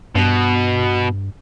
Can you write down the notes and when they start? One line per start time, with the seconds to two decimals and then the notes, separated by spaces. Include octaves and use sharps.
0.16 G2 B2